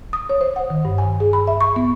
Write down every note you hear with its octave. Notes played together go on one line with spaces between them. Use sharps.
D#6
C#5
C5
F#5
D#3
G2
G#5
G#4
B5
E5
C#6
B3